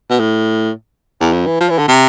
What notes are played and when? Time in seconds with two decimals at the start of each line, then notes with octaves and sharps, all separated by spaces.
0.10 B2
0.20 A2
1.20 E2
1.32 F2
1.46 E3
1.61 F3
1.70 E3
1.78 D3
1.88 C3